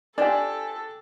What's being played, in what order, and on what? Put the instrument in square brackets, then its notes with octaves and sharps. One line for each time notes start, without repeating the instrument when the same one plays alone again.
[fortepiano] D4 G4 [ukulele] F4 C5 D5 [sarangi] A4 [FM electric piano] G#5